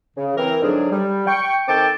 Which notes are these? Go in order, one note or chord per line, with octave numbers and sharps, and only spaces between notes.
C#3
E3 C4 A#4
G#2 D3 F#3 D4 G#4
G3
G5 C#6
D#3 C4 A4 G5 A5 D6